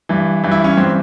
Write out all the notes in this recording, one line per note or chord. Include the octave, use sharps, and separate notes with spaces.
G2 E3
G2 E3
E4
C#4
G2 E3 C4